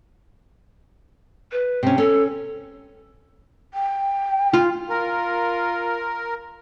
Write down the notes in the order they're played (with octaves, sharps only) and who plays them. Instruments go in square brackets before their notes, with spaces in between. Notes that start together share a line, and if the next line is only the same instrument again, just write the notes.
[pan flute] B4
[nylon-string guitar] C3 C#4
[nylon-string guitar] C#4 [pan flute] A4
[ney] G5
[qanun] F4
[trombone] F4 [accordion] A#4